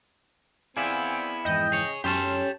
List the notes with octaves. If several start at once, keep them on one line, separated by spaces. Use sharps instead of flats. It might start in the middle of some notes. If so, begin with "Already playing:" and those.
B3 C4 E4 G#4 D5 F5 G#5 D7
F2 G#2 E3 D#5 G5
G#4 C#5
F#2 C#4 G4 A4 A5 C6 F6 E7